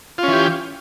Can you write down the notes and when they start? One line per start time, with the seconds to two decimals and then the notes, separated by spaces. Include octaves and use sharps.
0.18 F4
0.23 C#4
0.28 E3
0.33 G4